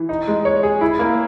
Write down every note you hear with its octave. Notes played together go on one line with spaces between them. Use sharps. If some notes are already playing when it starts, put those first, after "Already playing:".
Already playing: E3
D#4
G#3
C#5
G#4
E4
A#3